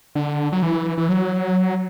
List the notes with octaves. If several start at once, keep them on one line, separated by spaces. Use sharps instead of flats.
D3
F#3
E3
E3
F#3